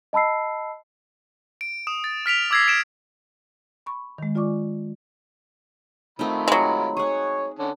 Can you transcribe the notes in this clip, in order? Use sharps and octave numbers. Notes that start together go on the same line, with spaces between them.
D#5 A5 B5 E6 C7
D7
D#6 E7
A6
F6 B6 D7 F7
D6 E6 G#6 A#6 C7
D7 E7 F7
B5 C#6
D#3 G#3
F4 D5 G#5 C#6 D6
D#3 A3 C4 D#4 F4 B5
F#3 G#3
G#4 C#5 F#5 C#6
D3 C#4 A5